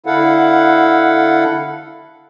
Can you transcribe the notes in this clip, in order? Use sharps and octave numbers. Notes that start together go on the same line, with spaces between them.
D3 E4 A4 F5 F#5